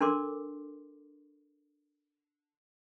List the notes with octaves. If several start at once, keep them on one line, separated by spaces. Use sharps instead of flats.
D4 A4 A#4 C6 D6